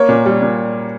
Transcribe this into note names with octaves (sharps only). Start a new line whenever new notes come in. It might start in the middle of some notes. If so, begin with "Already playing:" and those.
Already playing: A#3 C#5
A#2
G3
A#2